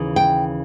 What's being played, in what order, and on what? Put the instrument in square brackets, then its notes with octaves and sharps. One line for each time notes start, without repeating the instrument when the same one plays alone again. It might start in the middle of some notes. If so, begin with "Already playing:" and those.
Already playing: [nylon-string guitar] D#2 C#3 E3
G5